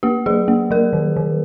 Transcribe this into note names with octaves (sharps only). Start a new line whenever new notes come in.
A#3 G4
F#3 G#4
A#3
F#3 A#4
D#3
D#3